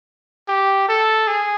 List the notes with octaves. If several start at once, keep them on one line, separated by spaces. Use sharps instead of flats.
G4
A4
G#4